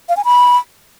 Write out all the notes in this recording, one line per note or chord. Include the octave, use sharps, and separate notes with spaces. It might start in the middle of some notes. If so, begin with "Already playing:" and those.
F5
G#5
B5